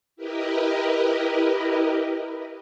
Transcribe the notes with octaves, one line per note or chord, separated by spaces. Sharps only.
E4 G4 A#4 B4 D#5